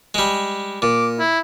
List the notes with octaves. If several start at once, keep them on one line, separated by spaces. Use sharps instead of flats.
G3 G#3
A#2 D6
E4